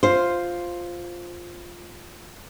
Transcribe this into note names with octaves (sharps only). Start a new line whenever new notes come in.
F4 C5